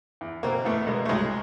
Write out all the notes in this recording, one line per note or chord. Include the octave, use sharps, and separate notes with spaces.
E2
B2 A#3 C4
E2 A3 B3
B3
B2 G#3 A#3
A3
C2 F#3 G#3